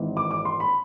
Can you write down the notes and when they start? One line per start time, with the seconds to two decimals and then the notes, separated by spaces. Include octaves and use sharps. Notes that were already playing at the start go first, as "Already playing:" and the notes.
Already playing: G#1 G#2 E3
0.17 D6
0.31 D6
0.45 C6
0.60 B5